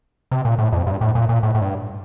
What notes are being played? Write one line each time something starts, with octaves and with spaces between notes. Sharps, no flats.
C3
A#2
A2
F2
G2
A2
A#2
A#2
A2
A2
G2